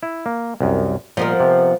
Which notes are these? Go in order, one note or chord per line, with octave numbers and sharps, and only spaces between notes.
E4
A#3
C2 F#2
A#2 F3 B3 A#4 D#5
C3